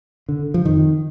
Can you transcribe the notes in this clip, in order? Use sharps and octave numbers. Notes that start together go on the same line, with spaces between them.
D3
F3
F2 D#3